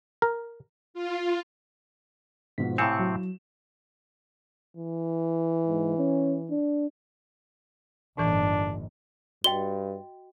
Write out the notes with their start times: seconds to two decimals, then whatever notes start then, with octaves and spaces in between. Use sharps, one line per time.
0.22 A#4
0.94 F4
2.58 G#2 B2 F3 B6
2.78 A2 C3 C4 E4 F5 G#5 C#7 E7
3.00 F#3
4.77 E3
5.68 G#2
5.98 C#4
6.50 D4
8.18 G1 D#2 A2 E3 D4
9.44 G2 F#4 D#5 G5 G7